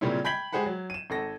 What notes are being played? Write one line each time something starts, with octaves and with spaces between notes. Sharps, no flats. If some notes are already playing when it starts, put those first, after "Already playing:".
A#2 C#3 G3 C4 C#4 E4
G5 B5 G6 G#6 B6 F#7
G#3 G4 G#4 C5 F#5 B5
F#3
D#7 E7
G#1 A4 A#6